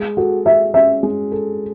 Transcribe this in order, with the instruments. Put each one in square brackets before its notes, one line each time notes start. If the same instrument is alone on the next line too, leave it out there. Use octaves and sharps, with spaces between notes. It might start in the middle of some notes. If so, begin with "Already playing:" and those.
Already playing: [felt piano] G#3
[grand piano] F#4 [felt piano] A4
[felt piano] F#4 [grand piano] E5
[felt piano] C#4 [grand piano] E5
[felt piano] G#3
A4